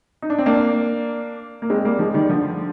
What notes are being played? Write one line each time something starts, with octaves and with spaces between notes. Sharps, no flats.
D#4
D4
C4
A#3 D4
A#3
G#3 C4
G3 A#3
F3 G#3
D#3 G3
D3 F3